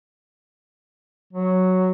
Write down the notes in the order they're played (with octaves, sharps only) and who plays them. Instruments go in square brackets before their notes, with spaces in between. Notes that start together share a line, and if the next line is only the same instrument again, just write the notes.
[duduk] F#3